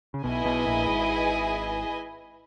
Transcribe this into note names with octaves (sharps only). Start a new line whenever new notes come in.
C#3
B1 B2 E4 G#4 B4 D#5 G#5
B1 B2
A#1 A#2
G#1 G#2